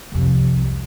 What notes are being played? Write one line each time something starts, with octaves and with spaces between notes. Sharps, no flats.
C2 F2